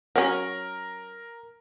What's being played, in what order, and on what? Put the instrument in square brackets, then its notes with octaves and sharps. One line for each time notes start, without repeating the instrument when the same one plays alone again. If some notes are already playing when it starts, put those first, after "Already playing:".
[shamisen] F#3 C#4 [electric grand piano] A#4